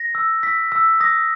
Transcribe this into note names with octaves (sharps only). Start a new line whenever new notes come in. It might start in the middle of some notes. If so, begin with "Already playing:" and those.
Already playing: A#6
E6
E6 B6
E6
D#6 A#6